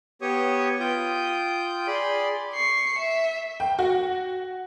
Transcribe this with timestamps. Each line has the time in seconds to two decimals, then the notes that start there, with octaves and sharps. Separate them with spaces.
0.22 B3 G4 C#5 C#6 D#6
0.80 F4 G5 D#6 G6
1.87 G#4 D5 B5 C6
2.54 C#6 C7
2.99 E5
3.60 G5
3.79 F#4